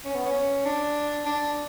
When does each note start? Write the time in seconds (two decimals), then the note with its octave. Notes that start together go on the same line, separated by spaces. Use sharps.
0.05 C#4
0.15 B3
0.26 C#4
0.66 D4
1.26 D4